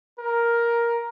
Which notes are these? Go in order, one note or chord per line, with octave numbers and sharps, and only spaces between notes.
A#4